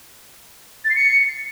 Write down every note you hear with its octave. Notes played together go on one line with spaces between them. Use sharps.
A6
C7
C#7